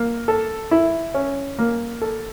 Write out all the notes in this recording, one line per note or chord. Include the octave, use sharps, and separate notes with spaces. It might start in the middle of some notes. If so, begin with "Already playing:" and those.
Already playing: A#3
A4
E4
C#4
A#3
A4